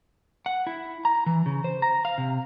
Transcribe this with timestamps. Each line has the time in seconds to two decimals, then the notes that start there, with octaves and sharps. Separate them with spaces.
0.46 F#5
0.67 E4
1.05 A#5
1.26 E3
1.46 C#3
1.64 C5
1.82 A#5
2.05 F5
2.18 C3